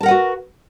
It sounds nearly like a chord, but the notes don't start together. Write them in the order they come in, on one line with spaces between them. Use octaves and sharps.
A5 A#4 F#5 B4 F#4